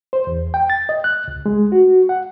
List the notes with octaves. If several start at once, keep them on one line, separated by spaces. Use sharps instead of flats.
C5
E2
G5
A6
D#5
F#6
C#2
G#3
F#4
F#5